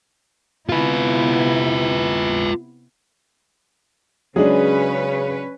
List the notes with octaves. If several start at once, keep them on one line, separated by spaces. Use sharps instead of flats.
C3 B3 E4 F4 B4
C#3 F#3 G#3 C#4 D4 G#4 B4